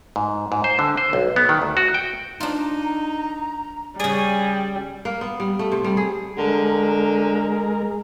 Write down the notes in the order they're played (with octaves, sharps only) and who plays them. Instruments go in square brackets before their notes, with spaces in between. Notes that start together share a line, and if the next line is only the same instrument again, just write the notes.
[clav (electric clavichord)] G#2
G#2
C5
D3
C5
B1
B3
D#3
D2
F#4
G5
[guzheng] D4 F4 [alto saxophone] D#4 [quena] A#5
[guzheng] C#3 D5 [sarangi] G3 [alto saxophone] G#4 [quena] G#5
[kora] A#3
B3
G3
A3
C3
G3
G#4
[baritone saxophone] D3 [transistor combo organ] G#3 A#4